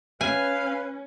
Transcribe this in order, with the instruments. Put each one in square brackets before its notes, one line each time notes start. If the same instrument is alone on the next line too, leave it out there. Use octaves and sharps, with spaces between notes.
[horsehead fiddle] C#4 [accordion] B4 [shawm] F5 [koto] G#5